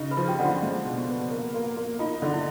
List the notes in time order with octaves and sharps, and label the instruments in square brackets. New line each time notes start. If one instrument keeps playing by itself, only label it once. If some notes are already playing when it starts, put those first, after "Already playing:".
Already playing: [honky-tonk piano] C#3 D#4
[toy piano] B4 B5
[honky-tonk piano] F3
[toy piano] G4 G5
[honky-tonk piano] D3 [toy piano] F#5
[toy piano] F4 F5
[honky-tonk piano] G#3
B2
B3
A#3
A#3
A#3
[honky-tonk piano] D#4 [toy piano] F4 F5
[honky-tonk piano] D3
[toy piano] E4 E5